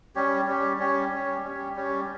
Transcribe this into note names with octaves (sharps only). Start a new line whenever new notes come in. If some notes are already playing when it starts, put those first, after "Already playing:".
G3 C#4 G4 C#5
G3 C#4 G4 C#5
G3 C#4 G4 C#5
G3 C#4 G4 C#5
G3 C#4 G4 C#5
G3 C#4 G4 C#5